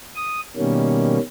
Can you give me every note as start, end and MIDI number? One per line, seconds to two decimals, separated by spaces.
0.15 0.40 87
0.56 1.18 47
0.56 1.18 51
0.56 1.18 55
0.56 1.18 58
0.56 1.18 61